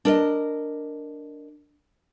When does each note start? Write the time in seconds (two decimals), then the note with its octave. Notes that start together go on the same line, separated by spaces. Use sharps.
0.05 D4 A#4 D#5